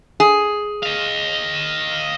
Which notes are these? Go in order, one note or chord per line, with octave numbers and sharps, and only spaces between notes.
G#4
D#5 F5